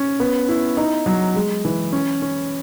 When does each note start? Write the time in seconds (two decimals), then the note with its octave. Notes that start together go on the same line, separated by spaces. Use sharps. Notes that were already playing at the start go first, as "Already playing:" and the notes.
Already playing: C#4
0.20 B3
0.49 E4
0.77 D#4
1.06 F#3
1.35 G#3
1.65 E3
1.92 C#4
2.22 C#4